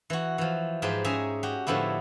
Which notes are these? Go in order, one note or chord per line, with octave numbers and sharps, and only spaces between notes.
E3 F#4
E3 F3
G#2 F3 G4 G#4 B4 G5
C#4 G#4 E5 G#5 A#5
F#4 G4
A2 D3 F3 B3 E4